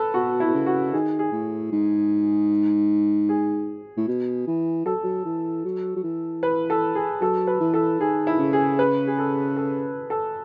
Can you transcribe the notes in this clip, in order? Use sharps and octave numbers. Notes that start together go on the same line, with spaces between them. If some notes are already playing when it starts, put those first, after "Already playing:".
Already playing: A4 B4
B2 F#4
E4
B2
C#3
F#4
D#3 G#4
G#4
A2
G#2
G#4
A2
B2
E3
F#3 A4
F#3
E3
F#3
F#3
E3
B4
A4
G#4
F#3 A4
B4
E3
A4
D#3 G#4
E4
C#3
G#4
B4
G#4
A4
A4
A4